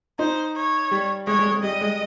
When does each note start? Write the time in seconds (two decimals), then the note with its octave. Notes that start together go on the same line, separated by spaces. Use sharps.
0.19 D#4 C5
0.55 C#5
0.91 G3
1.27 G#3 C#5
1.39 G#3
1.52 G#3
1.63 G3 D#5
1.81 G#3